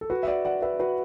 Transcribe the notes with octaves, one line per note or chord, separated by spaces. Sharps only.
A4
F#4 B4
E5
D5 F#5
D5 F#5
B4 E5
F#4 B4